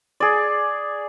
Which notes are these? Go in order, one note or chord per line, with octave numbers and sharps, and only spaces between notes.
G#4 D5